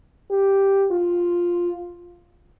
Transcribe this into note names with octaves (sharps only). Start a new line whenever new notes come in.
G4
F4